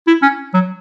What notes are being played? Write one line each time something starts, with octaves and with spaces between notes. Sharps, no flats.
E4
C#4
F#3